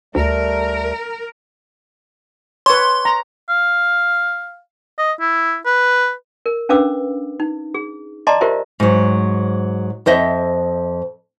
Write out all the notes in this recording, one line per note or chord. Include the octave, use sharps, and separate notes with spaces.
D2 G3 A3 A#4
B4 C#5 C6
A#5
F5
D#5
E4
B4
A#4
C#4 D4 B4 F5 D6 E6
D#4
G#4
D5 D#5 A5 A#5 C6 D6
F4 G4 A#4 C5 E5
G#2 F#3
F2 C5 D#5 E5